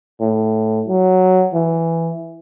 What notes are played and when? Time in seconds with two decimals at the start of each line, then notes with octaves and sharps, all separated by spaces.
0.21 A2
0.88 F#3
1.54 E3